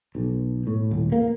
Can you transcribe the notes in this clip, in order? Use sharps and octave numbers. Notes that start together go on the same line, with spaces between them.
B1
A2
D#1
A#3